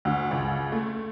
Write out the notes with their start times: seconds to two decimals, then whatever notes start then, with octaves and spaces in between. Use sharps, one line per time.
0.05 D2
0.31 C#2
0.72 A3